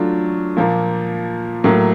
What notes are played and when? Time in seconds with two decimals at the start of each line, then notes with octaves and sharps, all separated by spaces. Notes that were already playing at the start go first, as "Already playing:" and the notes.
Already playing: F#3 A3 D4 F4
0.57 A#2 F3 A#3
1.64 A2 F#3 A#3